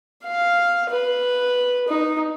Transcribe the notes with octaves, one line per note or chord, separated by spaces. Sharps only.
F5
B4
D#4